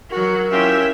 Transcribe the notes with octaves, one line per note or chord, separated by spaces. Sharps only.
F#3 F#4 A#4
C4 C#4 E4 F4 G4 E5